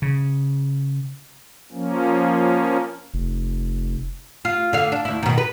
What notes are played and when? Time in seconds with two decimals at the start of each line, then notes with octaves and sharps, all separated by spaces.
0.02 C#3
1.72 F3 A#3 C#4
3.14 F1
4.45 F4
4.73 D3 F5
4.92 D4
5.05 D2 E4
5.23 B2 D#3
5.38 B4